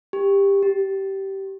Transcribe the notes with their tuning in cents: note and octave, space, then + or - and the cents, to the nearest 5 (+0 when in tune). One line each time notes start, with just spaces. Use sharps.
G4 +15
G4 -15